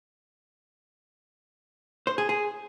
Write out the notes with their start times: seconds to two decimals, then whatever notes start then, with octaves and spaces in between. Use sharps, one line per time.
2.07 C5
2.18 G#4
2.29 G#4